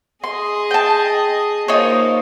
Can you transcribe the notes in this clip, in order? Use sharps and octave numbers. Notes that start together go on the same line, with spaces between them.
G#4 D#5 C6
G5 A5
A#3 D#4 F4 C5 C#5